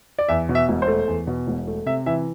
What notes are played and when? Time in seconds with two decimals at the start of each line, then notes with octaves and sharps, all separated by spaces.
0.18 D5
0.29 E2 E5
0.49 B2
0.55 E5
0.69 E1
0.82 C5
0.88 A3
1.08 E2
1.27 B2
1.47 E1
1.67 A3
1.86 C3 E5
2.06 E3 E5